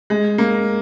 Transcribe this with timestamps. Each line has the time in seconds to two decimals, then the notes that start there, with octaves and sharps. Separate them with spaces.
0.10 G#3
0.38 A#3